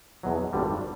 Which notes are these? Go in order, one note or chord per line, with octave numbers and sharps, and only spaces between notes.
E2 B2 F#3
G#1 G2 D3 G3